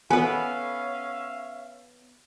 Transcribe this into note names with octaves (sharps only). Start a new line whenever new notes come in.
B3 C#4 A4 B4 E5 F5 G#5